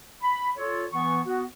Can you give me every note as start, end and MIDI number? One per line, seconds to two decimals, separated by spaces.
0.22 0.49 83
0.57 0.85 65
0.57 0.85 69
0.57 0.85 73
0.91 1.20 52
0.91 1.20 59
0.91 1.20 85
1.25 1.44 59
1.25 1.44 66